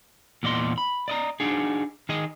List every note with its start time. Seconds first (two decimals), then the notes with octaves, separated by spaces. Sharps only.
0.43 E2 A#2 D5 D#5 C6
0.78 B5
1.08 D5 D#5 A#5
1.40 D4 D#4 F#4 G#4
2.09 D#3 G#4 D#5